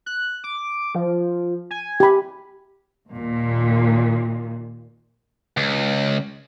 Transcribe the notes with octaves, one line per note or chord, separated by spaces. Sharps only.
F#6
D6
F3
G#5
G4 B5
D#2 A#2
C#2